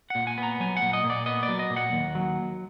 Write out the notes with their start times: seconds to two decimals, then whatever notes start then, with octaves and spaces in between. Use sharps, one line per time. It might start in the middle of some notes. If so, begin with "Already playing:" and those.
0.10 A#2 F#5
0.27 G#5
0.38 B3
0.43 A#5
0.60 F#3 G#5
0.77 F#5
0.82 A#2
0.93 D#5
1.04 A#2
1.10 D5
1.26 B3 D#5
1.43 D5
1.48 F#3
1.59 D#5
1.70 A#2
1.76 F#5
1.93 D#2
2.15 F#3